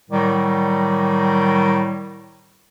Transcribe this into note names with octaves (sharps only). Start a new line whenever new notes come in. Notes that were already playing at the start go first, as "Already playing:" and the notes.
A2 D#3 F#3 G3